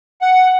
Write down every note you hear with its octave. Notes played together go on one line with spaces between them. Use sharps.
F#5